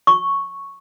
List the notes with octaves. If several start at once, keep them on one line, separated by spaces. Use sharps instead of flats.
C#6